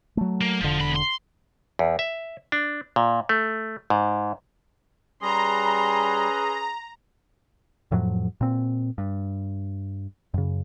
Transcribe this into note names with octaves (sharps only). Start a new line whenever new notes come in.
F#3 A3
A#3
E1 D3 F3
E2 B5
C6
E2
E5
D4
A#2
A3
G#2
G3 C#4 G#4 B4 A#5 C6
F2 A2 F3 F#3
A#2 C4
G2
F#2 C#3